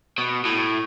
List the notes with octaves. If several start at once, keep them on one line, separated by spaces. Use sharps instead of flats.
B2
A2